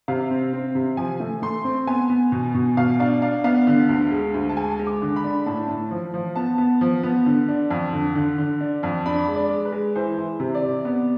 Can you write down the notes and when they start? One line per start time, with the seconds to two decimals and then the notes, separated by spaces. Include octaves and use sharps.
0.08 C3 F5
0.30 C4
0.53 C4
0.75 C3
0.97 F3 G#5
1.20 A3
1.42 A3 C6
1.64 C4
1.87 B3 G#5
2.10 B3
2.32 B2
2.54 B2
2.77 B2 F5
3.00 D4 F5
3.22 D4 F5
3.44 B3 F5
3.67 D3
3.89 D2
4.12 G#3
4.34 D2
4.49 A5
4.57 G#3 G#5
4.79 G#3
4.87 D6
5.02 D3
5.16 B5
5.24 D4
5.46 A2 A5
5.69 A2
5.91 F3
6.14 F3
6.36 B3 A5
6.58 B3
6.81 F3
7.03 B3
7.26 D3
7.49 D4
7.71 F2
7.93 D3
8.15 D3
8.38 D3
8.61 D4
8.83 F2
9.06 D4 B5
9.28 G#3
9.35 D5
9.50 G#3
9.65 B4
9.72 G#3
9.96 E3 C5
10.18 E3
10.40 C3
10.55 D5
10.62 C3
10.85 B3